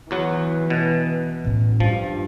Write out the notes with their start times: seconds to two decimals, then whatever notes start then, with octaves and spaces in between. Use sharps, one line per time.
0.11 E2 E3 F#3 F#5
0.70 B2
1.44 A2 C#4
1.80 G2 F3 D4